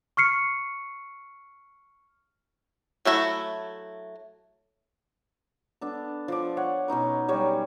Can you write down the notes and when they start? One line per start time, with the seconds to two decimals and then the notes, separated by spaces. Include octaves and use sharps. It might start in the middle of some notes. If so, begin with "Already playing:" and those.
0.17 C#6 F6 C7 C#7
3.05 F#3 A3 E4 F#4
5.81 B3 D4 A4
6.28 F3 D5
6.57 C#5 F#5
6.88 B2 C#4 D#4 B4
7.28 F#3 G3 C#5